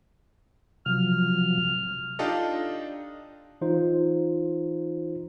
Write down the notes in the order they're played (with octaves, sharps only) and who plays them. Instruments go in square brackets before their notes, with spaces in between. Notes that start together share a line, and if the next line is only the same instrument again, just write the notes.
[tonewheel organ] C3 F3 F#3 [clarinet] F6
[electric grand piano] D4 D#4 F4 G4 A4 D#5
[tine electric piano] E3 D#4 F4 C5